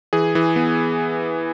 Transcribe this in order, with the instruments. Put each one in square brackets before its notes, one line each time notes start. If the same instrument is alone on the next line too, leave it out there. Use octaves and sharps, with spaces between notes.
[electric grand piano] E3 G#4
E3
B3